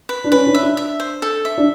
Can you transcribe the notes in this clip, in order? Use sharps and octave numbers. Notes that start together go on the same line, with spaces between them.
B4
D4
C#4 B4
D4
E5
D4
E5
C5
A4
E5
D4